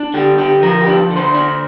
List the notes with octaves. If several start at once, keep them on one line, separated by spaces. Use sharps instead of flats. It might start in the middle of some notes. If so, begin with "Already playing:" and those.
Already playing: D4
D3 G4
D3 G4
F3 A#4
G4
D4
D3
C5
D4